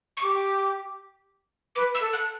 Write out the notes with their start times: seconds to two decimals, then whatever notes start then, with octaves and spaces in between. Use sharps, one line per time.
0.17 C#6
0.22 G4 D6
1.75 B4 D6
1.95 E6
2.01 A4
2.13 F#6